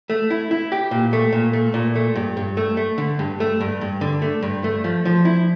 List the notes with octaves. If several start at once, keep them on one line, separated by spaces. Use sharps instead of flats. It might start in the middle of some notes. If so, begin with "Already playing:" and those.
A3
E4
E4
G4
A#2
A3
A#2
A3
A#2
A3
G2
G2
A3
A3
D3
G2
A3
G2
G2
D3
A3
G2
A3
F3
F3
E4